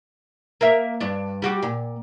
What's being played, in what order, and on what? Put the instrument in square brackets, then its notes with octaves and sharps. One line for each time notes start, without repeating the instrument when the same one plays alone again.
[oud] A#3 A#4 E5
G2 D4
G3 F#4 G4
A#2